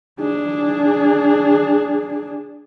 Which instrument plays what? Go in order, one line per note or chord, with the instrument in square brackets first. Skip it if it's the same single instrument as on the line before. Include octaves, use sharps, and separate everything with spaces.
[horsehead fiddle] D4 G#4